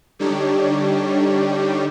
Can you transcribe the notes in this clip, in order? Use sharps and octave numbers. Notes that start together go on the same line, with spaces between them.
D3 G3 D4 D#4 G4 C#5